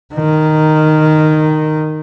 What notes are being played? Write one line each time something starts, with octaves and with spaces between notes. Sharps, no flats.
D#3